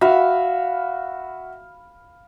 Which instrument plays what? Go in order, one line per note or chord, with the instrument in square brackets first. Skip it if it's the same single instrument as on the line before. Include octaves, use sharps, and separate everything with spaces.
[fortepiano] F#4 E5 [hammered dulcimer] F5 B5